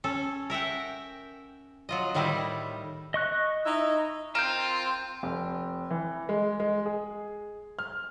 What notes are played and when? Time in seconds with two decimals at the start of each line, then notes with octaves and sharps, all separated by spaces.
0.04 C#4 A4
0.50 A#4 E5 F#5 G5
1.89 F#3 F4 D#5
2.14 A2 D#3 G3 D#4 E4 C5
3.14 D#5 C#6 F#6
3.65 D#4 E4 E5
4.35 C4 F4 A#4 G6 D7 E7
5.23 F1
5.90 E3
6.29 G#3
6.60 G#3
6.86 G#4
7.79 F6